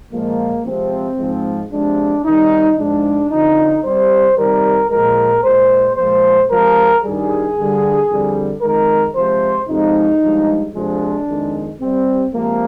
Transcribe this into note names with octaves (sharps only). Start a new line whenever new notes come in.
A#2 F3 G#3 A#3
C3 F3 G#3 C4
G#2 F3 G#3
C3 F3 G#3 D4
C3 D#3 G3 D#4
G#2 F3 G#3 D4
F2 D3 F3 D#4
C3 G3 C5
C3 D#3 G3 A#4
A#2 F3 G#3 A#4
A#2 G#3 C5
A#2 F3 G#3 C5
C3 F3 G#3 A#4
G2 D#3 G3 G#4
G2 D3 G3
F2 D3 G3
F2 D#3 G#3 A#4
C3 F3 G#3 C5
F2 C3 F3 G#3 D#4
G2 F3 G#3
F2 C3 F3 G#3 D4
F2 D#3 G#3
C3 G3 C4
C3 F3 G#3 A#3